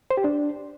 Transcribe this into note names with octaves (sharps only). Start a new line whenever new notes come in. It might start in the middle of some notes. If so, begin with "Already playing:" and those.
C5
G4
D4